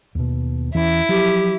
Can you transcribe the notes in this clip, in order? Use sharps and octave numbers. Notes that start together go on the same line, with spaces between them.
D#2 B2
E2 E3 C#4 E4
F3 F#3 G4